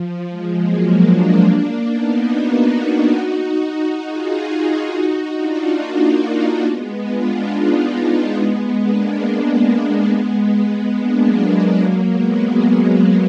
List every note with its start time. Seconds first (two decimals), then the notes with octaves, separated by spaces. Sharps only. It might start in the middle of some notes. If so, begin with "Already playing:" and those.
Already playing: F3
0.30 F3 G#3
0.59 F#3 A#3
1.02 A#3 D4
1.45 A#3 D4
1.88 B3 D#4
2.32 D#4 F#4
4.04 F4 G#4
4.90 D#4 F#4
5.33 D4 F4
5.77 A#3 D4
6.62 G#3 B3
7.06 D4 F4
7.49 B3 D#4
7.92 G#3 B3
8.35 G#3 B3
8.79 A#3 D4
9.22 G#3 B3
10.94 A#3 D4
11.23 F#3
11.52 F#3 A#3
11.81 F#3 A#3
12.09 G#3 B3
12.38 F#3 A#3
12.67 F#3 A#3